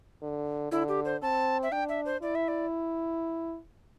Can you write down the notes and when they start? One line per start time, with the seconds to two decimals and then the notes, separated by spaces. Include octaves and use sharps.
0.22 D3
0.72 D3 E4
0.88 G4
1.05 C5
1.22 C4 A5
1.63 E5
1.72 D4 G5
1.89 E5
2.05 C5
2.22 E4 D5
2.35 E5
2.48 D5